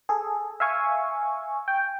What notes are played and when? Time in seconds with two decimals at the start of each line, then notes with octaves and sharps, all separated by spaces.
0.09 G#4 A4
0.60 E5 F5 G#5 C#6
1.68 G5